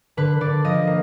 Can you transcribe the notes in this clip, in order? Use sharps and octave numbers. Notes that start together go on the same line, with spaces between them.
D3 B4
D3 D5
F3 D#5
A#3